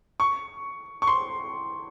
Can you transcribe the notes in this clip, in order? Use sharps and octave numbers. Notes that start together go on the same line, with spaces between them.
C#6
C#6
C6